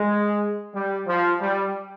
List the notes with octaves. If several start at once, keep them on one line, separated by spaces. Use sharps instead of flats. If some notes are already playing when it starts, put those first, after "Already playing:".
Already playing: G#3
G3
F3
G3